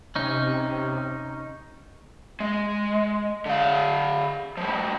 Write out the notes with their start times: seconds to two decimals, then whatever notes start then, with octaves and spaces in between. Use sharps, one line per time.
0.15 C3 C#4 D#4
2.40 G#3
3.46 D3 F5
4.57 F3 G3